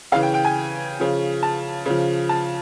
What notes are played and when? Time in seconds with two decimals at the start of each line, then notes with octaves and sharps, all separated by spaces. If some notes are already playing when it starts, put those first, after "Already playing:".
0.12 C#3 F5
0.15 E3
0.23 G5
0.34 G5
0.45 G#5
1.00 C#3 F3
1.43 A5
1.86 C#3 F3
2.29 A5